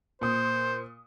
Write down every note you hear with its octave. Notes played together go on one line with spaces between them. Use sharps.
A#2 C5 D#6